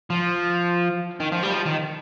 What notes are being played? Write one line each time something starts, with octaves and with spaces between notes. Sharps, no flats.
F3
D#3
F3
G3
F3
D#3